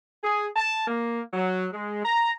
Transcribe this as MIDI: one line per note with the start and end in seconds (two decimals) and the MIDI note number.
0.24 0.46 68
0.56 0.85 81
0.88 1.21 58
1.34 1.67 54
1.73 2.00 56
2.04 2.31 82